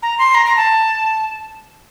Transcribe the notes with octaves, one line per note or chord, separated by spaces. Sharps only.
A#5
C6
A#5
A#5
A5